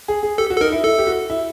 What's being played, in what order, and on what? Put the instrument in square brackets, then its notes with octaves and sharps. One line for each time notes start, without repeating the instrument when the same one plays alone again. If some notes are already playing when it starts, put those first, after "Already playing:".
[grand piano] G#4
G#4
[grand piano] G4 [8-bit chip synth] A4
[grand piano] F#4
[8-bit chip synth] A4
[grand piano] D#4 [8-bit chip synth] A#4
[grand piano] E4
[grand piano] E4 [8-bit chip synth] A4
[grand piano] G4
F#4
E4